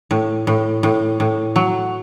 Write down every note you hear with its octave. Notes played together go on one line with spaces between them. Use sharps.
A2
A2
A2
A2
F#3